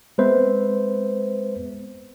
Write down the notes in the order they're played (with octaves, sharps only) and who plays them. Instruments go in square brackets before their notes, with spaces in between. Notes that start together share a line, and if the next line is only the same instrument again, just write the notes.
[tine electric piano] G#3 B3 C4 B4 C5 E5